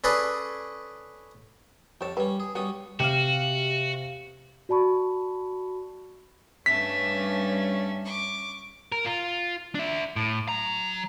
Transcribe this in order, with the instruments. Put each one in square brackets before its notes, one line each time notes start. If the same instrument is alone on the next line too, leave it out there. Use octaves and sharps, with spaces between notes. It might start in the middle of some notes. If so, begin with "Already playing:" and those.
[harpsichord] C#4 G#4 A4 B4 D5
[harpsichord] F2 A5 [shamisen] G4 C#5
[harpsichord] G3 C#4 [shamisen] B4
[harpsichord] G#4
[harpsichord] G3 C#4 D#6 [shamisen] B3 F#4
[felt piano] C3 C#7 [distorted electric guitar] F#4 [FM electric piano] G4 F5
[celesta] F#4 D5 A5 B5 C#6
[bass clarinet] G2 [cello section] G3 C#4 [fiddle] A3 E5 [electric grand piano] B6
[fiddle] C#6 D6
[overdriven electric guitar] A#4
F4
D4 E5
A2
F#3 A#5